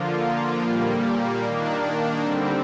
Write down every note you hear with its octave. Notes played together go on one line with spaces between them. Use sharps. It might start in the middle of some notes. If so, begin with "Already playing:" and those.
Already playing: D3 F3 A#3 F4
A#2 G3 A#3
D#3 A#3 D4
D3 G3 C4